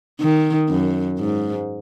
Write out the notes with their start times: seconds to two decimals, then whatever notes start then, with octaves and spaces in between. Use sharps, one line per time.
0.20 D#3
0.70 F#2
1.19 G#2